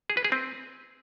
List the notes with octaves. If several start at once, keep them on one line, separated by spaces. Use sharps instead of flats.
G#4
B4
G#4
C4